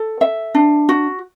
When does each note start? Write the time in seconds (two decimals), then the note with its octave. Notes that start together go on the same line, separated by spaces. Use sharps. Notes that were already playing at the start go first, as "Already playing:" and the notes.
Already playing: A4
0.21 E5
0.55 D4
0.89 F#4